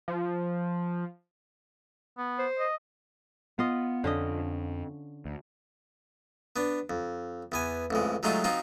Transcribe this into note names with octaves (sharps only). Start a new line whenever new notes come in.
F3
B3
C5
D#5
B3 F4 D#5
F2 D3 C#4 D#5
D2
B3 D4
F2
E2 B3 G#5
A1 F2 G#3
F#3 G#3 A3 D#4 F4 F#4
F3 C4 D#4 F4 F#4